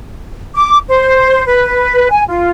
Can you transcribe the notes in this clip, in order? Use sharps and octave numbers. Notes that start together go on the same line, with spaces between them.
D6
C5
B4
G#5
F4